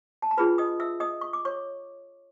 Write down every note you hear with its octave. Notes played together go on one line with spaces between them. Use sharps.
A5
A#5
D4 F4 G#4 B4 B5
D#5 D#6
E5 E6
D#5 D#6
C#6
D6
C#5 C#6